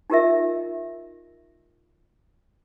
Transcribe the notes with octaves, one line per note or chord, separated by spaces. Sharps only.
D#4 F4 G4 A#4 D#5 E5